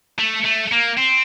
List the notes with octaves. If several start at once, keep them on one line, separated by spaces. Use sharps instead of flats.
A3
A3
A#3
C4